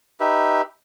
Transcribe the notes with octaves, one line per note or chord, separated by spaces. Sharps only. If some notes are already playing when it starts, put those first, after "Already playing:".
D#4 G4 B4 E5